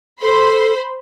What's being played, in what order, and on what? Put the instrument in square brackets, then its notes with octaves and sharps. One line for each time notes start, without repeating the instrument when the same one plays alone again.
[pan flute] A4 [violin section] C5 B5 C6